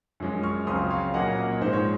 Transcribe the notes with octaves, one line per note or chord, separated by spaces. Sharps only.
F#2 F3 G#3 C#4
C#6 F6
C#2 C#3 F#3 C4 C6 D#6
C#5 F5
A#2 F#3 A#3 C#4 D#5 F#5
D#5
C#5
G#2 F3 G#3 C5
C#5